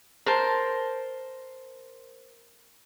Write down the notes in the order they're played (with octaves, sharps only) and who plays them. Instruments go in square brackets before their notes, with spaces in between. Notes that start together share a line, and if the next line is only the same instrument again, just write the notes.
[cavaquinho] A#4 C5 A5